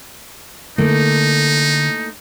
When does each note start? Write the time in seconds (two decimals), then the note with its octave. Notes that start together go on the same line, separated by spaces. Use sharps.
0.78 D3 A3 A#3 D#4 E4